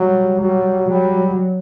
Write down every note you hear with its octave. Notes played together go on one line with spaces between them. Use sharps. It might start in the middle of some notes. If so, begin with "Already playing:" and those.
Already playing: F#3 G3
F#3 G3
F#3 G3